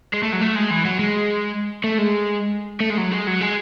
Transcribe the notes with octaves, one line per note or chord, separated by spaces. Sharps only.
G#3
A3
F#3
A3
G#3
E3
F#3
G#3
A3
G#3
A3
G#3
F#3
G#3
F#3
G#3